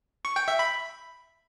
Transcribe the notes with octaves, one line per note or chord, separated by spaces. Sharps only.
C#6
G5
E5
B5